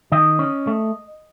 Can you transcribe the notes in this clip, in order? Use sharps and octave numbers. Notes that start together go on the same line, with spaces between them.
D#3 D#5
C#4
A3